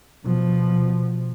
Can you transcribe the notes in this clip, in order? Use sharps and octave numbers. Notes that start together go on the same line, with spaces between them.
B2 F3